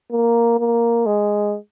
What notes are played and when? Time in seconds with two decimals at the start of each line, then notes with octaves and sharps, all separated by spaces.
0.11 A#3
0.60 A#3
1.06 G#3